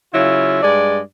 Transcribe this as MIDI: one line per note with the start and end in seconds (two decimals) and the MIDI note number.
0.13 0.59 49
0.13 0.59 54
0.13 0.59 64
0.13 0.59 65
0.63 0.99 43
0.63 0.99 56
0.63 0.99 74